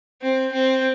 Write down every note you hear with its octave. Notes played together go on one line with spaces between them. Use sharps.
C4
C4